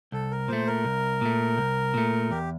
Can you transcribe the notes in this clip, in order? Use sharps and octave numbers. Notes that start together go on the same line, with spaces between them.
C2 A4
A#4
A#2 A3 C5
A#4
C2
A#2 A3
C2
A#2 A3
E2 G4